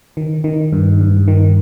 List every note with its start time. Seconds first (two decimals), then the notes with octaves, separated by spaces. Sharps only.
0.17 D#3
0.44 D#3
0.73 G2
1.01 G2
1.28 D#3